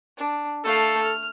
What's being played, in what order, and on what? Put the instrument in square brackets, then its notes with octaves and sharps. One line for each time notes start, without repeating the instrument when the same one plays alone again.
[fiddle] D4
[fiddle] A3 F5 [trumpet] A4
[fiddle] F6